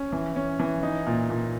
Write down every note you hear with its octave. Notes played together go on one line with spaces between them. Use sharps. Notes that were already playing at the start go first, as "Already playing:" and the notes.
Already playing: C#4
E3
C#4
E3
D#4
A#2
A#2